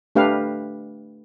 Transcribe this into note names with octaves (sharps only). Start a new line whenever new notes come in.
A3 D4 G4 B4 F5